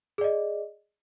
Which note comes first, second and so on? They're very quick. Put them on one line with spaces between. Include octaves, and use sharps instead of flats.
G#4 D5 D#5